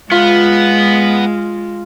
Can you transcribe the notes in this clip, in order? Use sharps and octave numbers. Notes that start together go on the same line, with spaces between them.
G#3 B3 F4